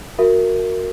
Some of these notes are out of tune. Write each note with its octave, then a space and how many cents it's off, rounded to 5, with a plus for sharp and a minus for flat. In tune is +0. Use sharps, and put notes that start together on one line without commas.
F#4 -10 A#4 -15 E5 +10